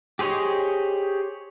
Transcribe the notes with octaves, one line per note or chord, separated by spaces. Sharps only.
G4 G#4 C5 C#5 D#5